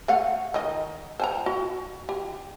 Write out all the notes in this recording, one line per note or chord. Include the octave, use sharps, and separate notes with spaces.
A3 F5 F#5
D#3 D#5
C5 G#5 A#5
F#4
G4